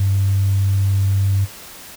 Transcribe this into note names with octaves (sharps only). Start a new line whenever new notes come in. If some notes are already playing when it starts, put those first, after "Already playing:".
Already playing: G2